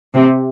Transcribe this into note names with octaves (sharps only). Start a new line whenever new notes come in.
C3